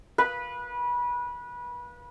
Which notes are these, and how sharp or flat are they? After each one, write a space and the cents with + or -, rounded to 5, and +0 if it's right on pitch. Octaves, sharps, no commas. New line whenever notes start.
B4 -25 F5 +0